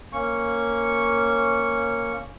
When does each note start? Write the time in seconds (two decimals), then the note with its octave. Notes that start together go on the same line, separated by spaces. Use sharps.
0.13 A#3 C#4 C#6